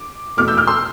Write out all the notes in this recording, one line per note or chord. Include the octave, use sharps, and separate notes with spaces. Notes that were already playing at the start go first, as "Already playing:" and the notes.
Already playing: D6
E2 B2 A3 D6 F6
E6 G6
D6 F6
C6 E6